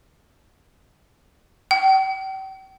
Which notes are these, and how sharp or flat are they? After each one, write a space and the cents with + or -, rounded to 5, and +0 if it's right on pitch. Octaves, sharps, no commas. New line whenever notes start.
G5 -40